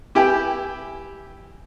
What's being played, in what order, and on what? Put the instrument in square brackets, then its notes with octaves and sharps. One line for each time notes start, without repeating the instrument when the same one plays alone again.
[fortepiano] E4 G4 G5 G#5